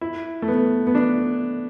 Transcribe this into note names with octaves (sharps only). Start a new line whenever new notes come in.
E4
A3
B3
B3
D4